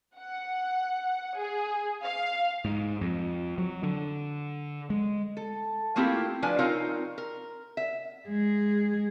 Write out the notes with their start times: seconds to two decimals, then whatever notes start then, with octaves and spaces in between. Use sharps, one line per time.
0.17 F#5
1.37 G#4
2.02 F5
2.65 G#2
3.01 F2
3.58 F#3
3.83 D3
4.90 G#3
5.37 A4
5.96 A3 A#3 C4 E4 F4 G4
6.42 F3 D4 B4 G#5
6.59 C4 D#4 F4 A#4 C#5 F5
7.18 A#4
7.77 E5
8.27 G#3 G#4